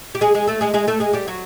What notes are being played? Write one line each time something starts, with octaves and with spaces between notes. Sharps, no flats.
G4
G#3 G#4
G#3 G#4
A3 A4
G#3 G#4
G#3 G#4
A3 A4
G#3 G#4
G3 G4
F#3 F#4